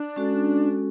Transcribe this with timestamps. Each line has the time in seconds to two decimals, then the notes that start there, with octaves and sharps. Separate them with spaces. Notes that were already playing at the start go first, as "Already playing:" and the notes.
Already playing: D4
0.16 G#3 C#4 F#4 A4